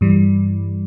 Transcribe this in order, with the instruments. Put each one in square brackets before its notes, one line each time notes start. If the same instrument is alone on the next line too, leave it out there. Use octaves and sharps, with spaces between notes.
[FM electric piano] G2 E3 G3